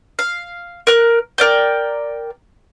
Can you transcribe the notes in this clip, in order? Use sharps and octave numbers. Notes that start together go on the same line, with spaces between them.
F5
A#4 F#6
A#4 D5 G5